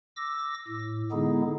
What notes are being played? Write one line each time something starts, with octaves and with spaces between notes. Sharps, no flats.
D6 E6 A#6
A2
D3 G#3 B3 D#4 E4 G#4